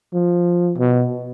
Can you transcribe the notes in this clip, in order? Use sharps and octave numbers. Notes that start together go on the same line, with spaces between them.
F3
B2